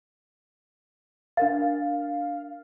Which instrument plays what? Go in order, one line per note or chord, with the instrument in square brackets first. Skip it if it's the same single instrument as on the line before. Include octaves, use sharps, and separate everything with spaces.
[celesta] D4 A#4 A6 [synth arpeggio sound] F5